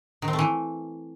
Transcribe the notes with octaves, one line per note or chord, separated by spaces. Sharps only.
D#3
C4
A3
E3